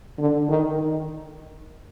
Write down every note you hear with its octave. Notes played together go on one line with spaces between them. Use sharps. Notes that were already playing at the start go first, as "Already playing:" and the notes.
D3
D#3